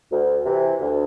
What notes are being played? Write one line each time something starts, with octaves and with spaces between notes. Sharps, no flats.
D2
C3 E3
D2